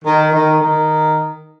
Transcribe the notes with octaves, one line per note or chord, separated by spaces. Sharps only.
D#3
D#3
D#3